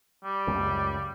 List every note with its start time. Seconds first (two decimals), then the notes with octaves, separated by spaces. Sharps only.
0.24 G3
0.47 C#2 F#2 C#3